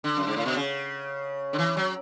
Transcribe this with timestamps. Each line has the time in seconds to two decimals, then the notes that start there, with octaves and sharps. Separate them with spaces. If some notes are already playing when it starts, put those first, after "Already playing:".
0.04 D3
0.17 F#2
0.27 G#2
0.36 A2
0.46 B2
0.56 C#3
1.53 D3
1.58 E3
1.77 F#3